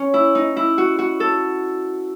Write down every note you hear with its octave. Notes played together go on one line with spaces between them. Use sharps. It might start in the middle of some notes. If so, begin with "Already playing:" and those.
Already playing: C#4
E4
D#4
E4
F#4
F#4
A4